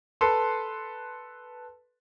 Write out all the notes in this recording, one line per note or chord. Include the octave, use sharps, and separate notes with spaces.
A4 B4 C6